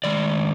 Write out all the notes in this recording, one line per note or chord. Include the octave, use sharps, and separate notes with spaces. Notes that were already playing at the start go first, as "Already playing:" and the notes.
D#3 G#3 D5